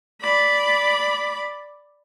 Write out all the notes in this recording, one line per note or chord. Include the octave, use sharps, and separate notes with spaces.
D5 B5